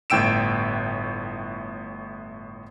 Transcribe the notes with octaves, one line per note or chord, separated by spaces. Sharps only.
G1 A2 G5 E6 D7 E7